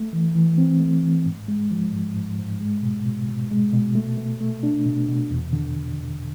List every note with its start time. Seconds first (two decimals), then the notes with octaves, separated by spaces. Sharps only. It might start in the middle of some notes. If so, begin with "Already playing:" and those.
Already playing: A3
0.13 E3
0.35 E3
0.58 C4
0.80 A3
1.03 E3
1.26 G#2
1.48 G#3
1.71 F3
1.93 G#2
2.16 G#2
2.38 G#2
2.61 G#3
2.83 B2
3.05 B2
3.28 B2
3.51 G#3
3.73 B2
3.95 A3
4.17 A3
4.41 A3
4.63 D4
4.86 B2
5.09 B2
5.30 E2
5.53 D3